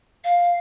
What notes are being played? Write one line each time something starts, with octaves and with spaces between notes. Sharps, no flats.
F5